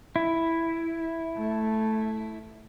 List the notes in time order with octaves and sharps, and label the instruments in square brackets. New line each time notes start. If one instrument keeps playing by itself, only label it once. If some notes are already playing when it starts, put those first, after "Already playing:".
[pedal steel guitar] E4
[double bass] A3